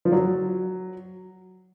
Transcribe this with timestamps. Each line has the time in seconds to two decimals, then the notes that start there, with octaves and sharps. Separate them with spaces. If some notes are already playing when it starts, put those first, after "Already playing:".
0.05 F3
0.12 F#3